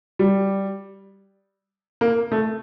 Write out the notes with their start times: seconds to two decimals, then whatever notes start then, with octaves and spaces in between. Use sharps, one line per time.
0.19 G3
2.01 A#3
2.32 A3